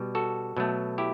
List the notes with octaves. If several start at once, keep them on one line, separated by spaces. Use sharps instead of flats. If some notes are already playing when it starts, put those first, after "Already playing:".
Already playing: B2 G3
F#4 A4
B2 F#3 A3
E4 G4